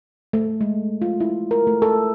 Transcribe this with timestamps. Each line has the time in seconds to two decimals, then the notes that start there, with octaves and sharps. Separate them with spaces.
0.33 A3
0.61 G#3
1.02 F4
1.20 E4
1.51 A#4
1.67 A3
1.82 A4